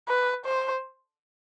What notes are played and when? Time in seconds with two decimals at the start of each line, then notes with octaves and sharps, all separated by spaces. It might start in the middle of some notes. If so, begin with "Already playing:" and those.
0.08 B4
0.45 C5